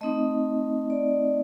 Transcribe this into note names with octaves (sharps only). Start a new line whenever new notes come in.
A3 C4 D#4 D#5
D5